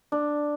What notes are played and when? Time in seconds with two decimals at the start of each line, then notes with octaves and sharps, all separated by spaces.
0.12 D4